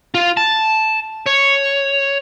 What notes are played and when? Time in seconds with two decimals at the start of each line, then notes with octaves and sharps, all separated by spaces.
0.14 F4
0.37 A5
1.26 C#5